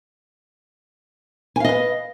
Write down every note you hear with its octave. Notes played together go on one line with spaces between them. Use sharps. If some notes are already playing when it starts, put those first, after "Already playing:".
B4 D#5 F5 G#5